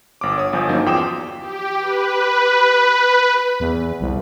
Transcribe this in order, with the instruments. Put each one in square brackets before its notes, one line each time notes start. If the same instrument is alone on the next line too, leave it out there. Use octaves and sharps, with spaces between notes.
[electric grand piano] G1 D6
C#5 D#6
G1 F3 G#5 G6
F3 F#3 A#3 C#4 D#4
E2 F4 G5 D6 D#6 E7
[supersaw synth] G4
B4
[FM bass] E2
C2